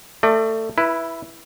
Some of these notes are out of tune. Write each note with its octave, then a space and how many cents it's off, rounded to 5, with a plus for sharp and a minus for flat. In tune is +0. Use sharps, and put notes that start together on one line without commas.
A3 +20 D5 +35
E4 +5 B4 -20